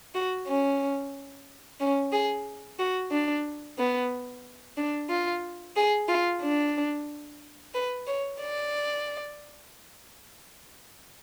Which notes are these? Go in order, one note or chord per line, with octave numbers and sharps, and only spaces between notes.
F#4
C#4
C#4
G#4
F#4
D4
B3
D4
F4
G#4
F4
D4
B4
C#5
D5